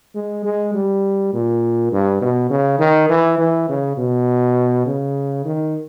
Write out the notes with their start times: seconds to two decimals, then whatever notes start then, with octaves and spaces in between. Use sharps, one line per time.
0.15 G#3
0.45 G#3
0.74 G3
1.33 A#2
1.92 G2
2.21 B2
2.50 C#3
2.79 D#3
3.09 E3
3.38 E3
3.69 C#3
3.97 B2
4.86 C#3
5.45 D#3